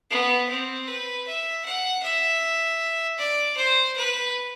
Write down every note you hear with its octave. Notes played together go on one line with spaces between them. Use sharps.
B3
C4
B4
E5
F#5
E5
D5
C5
B4